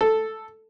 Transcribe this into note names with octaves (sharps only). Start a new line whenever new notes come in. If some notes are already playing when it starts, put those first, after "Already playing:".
A4